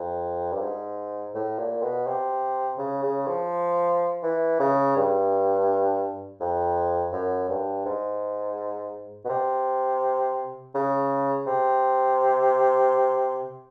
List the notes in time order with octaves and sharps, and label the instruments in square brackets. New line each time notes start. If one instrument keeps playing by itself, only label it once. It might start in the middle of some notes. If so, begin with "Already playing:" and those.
Already playing: [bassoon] F2
G2
G#2
A2
A#2
B2
C3
C#3
C#3
F3
E3
C#3
G2
F2
F#2
G2
G#2
B2
C3
C#3
C3